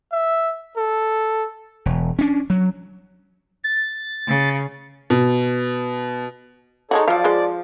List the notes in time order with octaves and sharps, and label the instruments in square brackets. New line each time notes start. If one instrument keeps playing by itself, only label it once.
[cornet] E5
A4
[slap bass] E1
C#4 D4
F#3
[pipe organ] A6
[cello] C#3
[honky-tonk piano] B2
[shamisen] G#3 A#3 F#4 [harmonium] D#4 A4 C#5
[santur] F3 [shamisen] F#3 F5 [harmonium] D5
[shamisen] G#3 C5